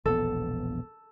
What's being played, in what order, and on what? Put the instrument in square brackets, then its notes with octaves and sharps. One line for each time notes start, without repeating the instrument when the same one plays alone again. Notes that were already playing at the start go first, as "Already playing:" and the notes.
[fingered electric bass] E1 A#1 B3 [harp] A4